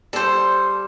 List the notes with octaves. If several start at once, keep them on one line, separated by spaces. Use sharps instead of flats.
G3 A4 C5